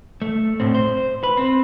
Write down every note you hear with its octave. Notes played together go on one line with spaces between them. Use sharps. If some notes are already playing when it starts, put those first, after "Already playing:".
A3
A2 C4
C5
B4
C4